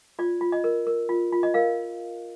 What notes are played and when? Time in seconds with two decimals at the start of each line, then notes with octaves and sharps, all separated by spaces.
0.19 F4 D5
0.41 F4
0.52 D#5
0.64 A#4
0.87 A#4
1.09 F4
1.32 F4
1.43 D#5
1.54 A#4 F5